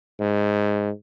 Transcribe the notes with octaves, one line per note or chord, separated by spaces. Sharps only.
G#2